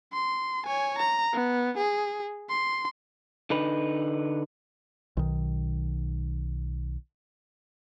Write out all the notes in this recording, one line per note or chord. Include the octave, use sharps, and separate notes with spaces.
C6
C#5 G#5
A#5
B3
G#4
C6
D3 D#4 B4
B1 D#3